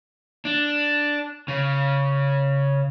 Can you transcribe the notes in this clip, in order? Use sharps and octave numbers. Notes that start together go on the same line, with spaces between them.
D4
C#3